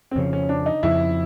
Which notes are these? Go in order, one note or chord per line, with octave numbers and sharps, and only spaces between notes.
C4
F2 C#3 F3 C#4
C#4
D4
D#4
F2 C#3 F3 E4